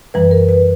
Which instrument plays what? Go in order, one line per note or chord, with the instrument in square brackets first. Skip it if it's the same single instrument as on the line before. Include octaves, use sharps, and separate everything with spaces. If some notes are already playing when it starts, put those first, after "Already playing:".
[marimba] F#2 E3 G3 B4
A#4
B4